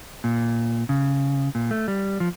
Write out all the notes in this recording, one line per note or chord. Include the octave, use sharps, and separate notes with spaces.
A#2
C#3
A#2
A3
G3
F3